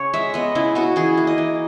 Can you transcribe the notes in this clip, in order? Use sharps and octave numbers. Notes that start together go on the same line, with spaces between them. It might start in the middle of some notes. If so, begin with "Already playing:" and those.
Already playing: C#3 C#5
G#3 E5
B3 D#5
C#3 E4
B3 F#4
E3 G#4
A#3
D#5
E3